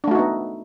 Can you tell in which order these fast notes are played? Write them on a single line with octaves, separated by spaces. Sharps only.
D4 A3 F#4 D#4 B3